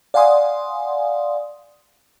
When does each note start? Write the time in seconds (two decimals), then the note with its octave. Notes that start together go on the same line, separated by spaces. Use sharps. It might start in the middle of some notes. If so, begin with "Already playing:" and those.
0.14 D5 F5 F#5 G#5 C6 D#6